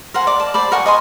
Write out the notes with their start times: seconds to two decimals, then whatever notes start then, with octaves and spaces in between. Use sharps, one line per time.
0.14 A#4 C5 F#5 G#5
0.27 D5 D6
0.40 A5
0.54 C5 D5 B5
0.72 A#4 F#5 G#5 C#6
0.86 D#5 G#5 C6